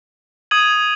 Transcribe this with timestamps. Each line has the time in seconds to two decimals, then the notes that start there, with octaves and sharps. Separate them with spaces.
0.51 D#6 G#6 D#7 F#7